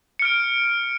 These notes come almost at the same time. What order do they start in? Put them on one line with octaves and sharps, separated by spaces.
C#7 F6 D7